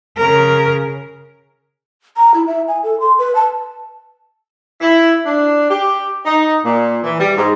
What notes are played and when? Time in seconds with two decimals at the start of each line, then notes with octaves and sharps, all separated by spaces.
0.17 C#3 A#4
2.17 A#5
2.34 E4
2.47 E5
2.68 G#5
2.84 A4
3.00 C6
3.19 B4
3.35 A5
4.80 E4
5.26 D4
5.70 G4
6.26 D#4
6.65 A#2
7.03 E3
7.20 G3
7.37 G#2